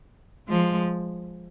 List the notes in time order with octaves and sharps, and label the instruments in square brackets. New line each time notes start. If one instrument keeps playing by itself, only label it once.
[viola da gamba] F3 G#3